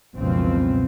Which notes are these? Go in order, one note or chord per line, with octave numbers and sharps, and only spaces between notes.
F#1 C#2 B2 F3 C4